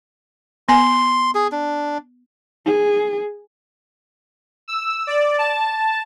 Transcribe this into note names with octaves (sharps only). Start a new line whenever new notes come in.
B3 G#5 C6
G#4
D4
G#4
E6
D5
A5